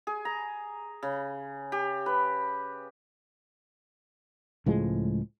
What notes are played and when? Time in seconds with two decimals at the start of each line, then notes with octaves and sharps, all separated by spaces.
0.07 G#4
0.25 A#5
1.03 C#3
1.72 G4
2.06 B4
4.66 C#2 A2 F3 G#3